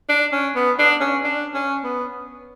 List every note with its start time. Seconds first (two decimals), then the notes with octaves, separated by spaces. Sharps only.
0.09 D4
0.32 C#4
0.55 B3
0.79 D4
1.01 C#4
1.24 D4
1.54 C#4
1.84 B3